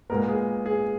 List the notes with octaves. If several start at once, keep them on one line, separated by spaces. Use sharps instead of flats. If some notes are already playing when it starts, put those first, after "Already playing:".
A#2 G#3 B3 A#4
G#4
G#4